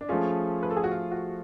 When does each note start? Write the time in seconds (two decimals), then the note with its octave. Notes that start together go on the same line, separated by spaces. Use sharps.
0.01 D4
0.09 F3 A3 C#4 F4 G#4
0.63 B4
0.71 A4
0.77 G#4
0.84 F#4
0.91 F4
1.11 F#4